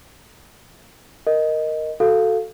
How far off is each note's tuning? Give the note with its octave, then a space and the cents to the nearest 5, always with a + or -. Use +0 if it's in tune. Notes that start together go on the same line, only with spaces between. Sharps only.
A#4 +0 D#5 +0
F#4 +0 A4 +0 F5 +0